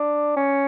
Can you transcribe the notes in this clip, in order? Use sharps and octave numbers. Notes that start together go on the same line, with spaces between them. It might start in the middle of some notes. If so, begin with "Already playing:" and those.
Already playing: D4
C#4